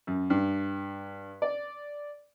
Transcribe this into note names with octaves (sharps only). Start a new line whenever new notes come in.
F#2
G2
D5